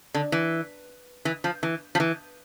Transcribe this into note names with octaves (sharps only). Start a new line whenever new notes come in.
D3
E3
E3
F3
E3
F3
E3